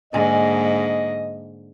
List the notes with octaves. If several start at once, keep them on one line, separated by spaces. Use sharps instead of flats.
G#2 D3 A#3 D5 D#5 G#5